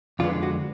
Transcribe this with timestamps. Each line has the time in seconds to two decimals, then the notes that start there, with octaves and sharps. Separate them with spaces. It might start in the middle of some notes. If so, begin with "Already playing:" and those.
0.19 F2 D3 G#3 B3 F4
0.43 F#4